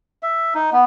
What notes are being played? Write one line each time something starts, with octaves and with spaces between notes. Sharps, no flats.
E5
D#4
B3